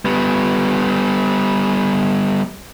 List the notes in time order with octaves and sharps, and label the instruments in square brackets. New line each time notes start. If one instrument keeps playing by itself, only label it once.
[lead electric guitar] G3 B3